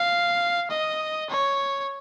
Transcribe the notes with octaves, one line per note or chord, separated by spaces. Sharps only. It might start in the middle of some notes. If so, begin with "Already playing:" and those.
Already playing: F5
D#5
C#5